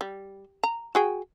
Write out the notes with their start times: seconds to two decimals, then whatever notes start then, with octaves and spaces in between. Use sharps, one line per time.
0.01 G3
0.63 A#5
0.95 F#4 G#4 G5